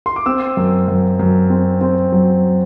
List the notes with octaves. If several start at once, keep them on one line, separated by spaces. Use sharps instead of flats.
C6
D6
C4 E6
F#2
F#2
F#2
C4
C4
F#3